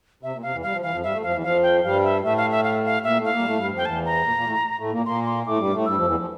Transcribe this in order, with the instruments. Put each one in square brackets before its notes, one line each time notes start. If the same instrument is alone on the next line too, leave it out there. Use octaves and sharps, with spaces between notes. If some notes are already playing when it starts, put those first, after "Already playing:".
[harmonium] C3 [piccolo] E5
[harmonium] A#2
[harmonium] C3 [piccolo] F5
[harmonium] E2 E3
[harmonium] G3 [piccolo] F5
[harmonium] F3
[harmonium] E3 [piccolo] F5
[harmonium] F2 F3
[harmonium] G2 G3 [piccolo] E5
[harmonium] A2 A3
[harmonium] F2 F3 [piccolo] F5
[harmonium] E2 E3
[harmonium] F2 F3 [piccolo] F5
[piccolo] G5
[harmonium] G2 G3 [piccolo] F5
[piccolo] E5
[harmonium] A2 A3 [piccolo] E5
[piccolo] F5
E5
F5
F5
[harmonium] A#2 A#3 [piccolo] E5
[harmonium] A2 A3
[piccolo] F5
[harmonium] A#2 A#3
G3
A2 A3
G2 G3
F2 F3
[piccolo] G5
[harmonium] E2 E3 [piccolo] A5
[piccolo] A#5
[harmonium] A#2 A#3
A#2 A#3
A2 A3
A2 A3
A#2 A#3
[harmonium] A#2 A#3 [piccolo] C6
[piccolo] C6
[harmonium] A2 A3 [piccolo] D6
[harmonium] G2 G3
A2 A3
[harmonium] G2 G3 [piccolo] E6
[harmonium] F2 F3
E2 E3
F3